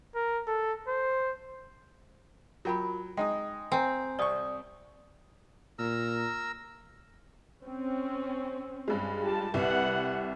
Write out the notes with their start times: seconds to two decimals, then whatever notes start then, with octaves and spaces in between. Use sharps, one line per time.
0.15 A#4
0.47 A4
0.88 C5
2.65 F#3 F4 A#4 G5 B5
3.17 G#3 D#4 G5 D#6
3.72 C4 G#5 A#5
4.19 C2 D5 C#6 D#6
5.79 A#2 A#4 A#5 E6
7.63 C4 C#4
8.88 G2 G#3
9.21 F4 G4 A5
9.54 C2 G4 B4 F#5